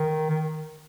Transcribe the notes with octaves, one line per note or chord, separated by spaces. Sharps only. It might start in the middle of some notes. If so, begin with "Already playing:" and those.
Already playing: D#3
D#3